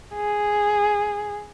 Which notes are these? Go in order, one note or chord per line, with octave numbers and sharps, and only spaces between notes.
G#4